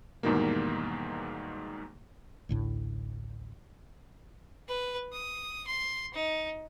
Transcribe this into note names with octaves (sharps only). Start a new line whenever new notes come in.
E2 G#2 B2 D#3 G3 A#3
A1 D2 A2
B4
D#6
C6
D#4